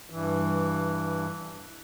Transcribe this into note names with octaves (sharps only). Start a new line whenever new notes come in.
G2 E3